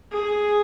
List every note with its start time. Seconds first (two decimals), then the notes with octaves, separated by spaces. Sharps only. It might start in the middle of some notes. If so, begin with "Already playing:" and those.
0.12 G#4